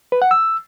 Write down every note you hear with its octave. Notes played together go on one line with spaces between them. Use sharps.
B4
F#5
E6